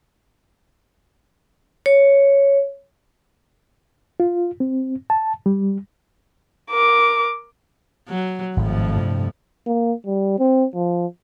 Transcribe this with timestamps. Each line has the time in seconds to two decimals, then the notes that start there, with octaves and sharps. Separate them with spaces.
1.86 C#5
4.20 F4
4.60 C4
5.10 A5
5.46 G3
6.71 A#4 D6
8.09 F#3
8.57 G#1 F2 A2 F3
8.96 G2 C3
9.67 A#3
10.06 G3
10.39 C4
10.75 F3